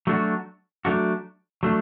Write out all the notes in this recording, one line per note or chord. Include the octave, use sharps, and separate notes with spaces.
F#3 A3 D4 F#4
F#3 A3 D4 F#4
F#3 A3 D4